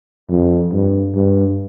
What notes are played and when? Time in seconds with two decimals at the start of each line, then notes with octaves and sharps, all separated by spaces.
0.30 F2
0.73 G2
1.15 G2